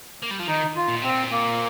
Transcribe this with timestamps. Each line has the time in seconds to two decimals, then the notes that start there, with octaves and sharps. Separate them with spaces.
0.22 A#3
0.31 G3
0.39 F3
0.47 D#3 D#4
0.76 F4
0.89 A#2
1.02 C3 C4
1.09 A#2
1.31 A#3